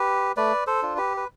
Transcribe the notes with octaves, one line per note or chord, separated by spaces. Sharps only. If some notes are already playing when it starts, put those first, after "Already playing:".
Already playing: G4 B4
A3 B4 D5
A4 C5
D4 F4
G4 B4
B4